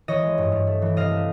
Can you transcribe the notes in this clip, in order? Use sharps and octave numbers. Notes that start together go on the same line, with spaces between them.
E3 C#5 D#5
G#3
G2
G2
A3
E3
C3 D#5 F5
A3